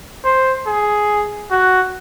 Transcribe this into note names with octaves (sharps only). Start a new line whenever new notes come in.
C5
G#4
F#4